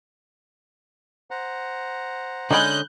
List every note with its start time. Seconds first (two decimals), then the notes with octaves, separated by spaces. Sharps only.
1.31 C5 F#5 A#5
2.51 D3 G#3 C#4 D#4 D5 B5 F#6 G6